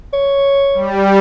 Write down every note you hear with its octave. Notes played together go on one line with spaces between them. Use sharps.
C#5
G3